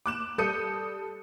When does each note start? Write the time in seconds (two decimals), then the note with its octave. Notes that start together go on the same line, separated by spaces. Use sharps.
0.06 D6 F#6 E7
0.38 G3 A4 D#6 G6 C#7 D#7